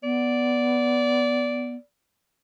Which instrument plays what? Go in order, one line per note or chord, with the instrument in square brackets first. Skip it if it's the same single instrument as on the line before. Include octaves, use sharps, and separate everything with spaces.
[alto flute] B3 [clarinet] D5